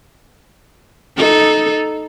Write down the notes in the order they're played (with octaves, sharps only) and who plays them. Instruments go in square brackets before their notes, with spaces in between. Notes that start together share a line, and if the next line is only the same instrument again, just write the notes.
[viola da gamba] D#4 A4